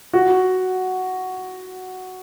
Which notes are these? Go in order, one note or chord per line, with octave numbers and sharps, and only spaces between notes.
F#4